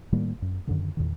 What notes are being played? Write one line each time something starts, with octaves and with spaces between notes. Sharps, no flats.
A2 D#3 G3 A#3
F#2
F#2 D3 D#3
E2 A#2 D#3